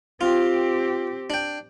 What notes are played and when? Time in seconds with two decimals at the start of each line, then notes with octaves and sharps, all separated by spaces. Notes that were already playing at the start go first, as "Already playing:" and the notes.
0.21 C4 F4 G4
1.30 D4 G5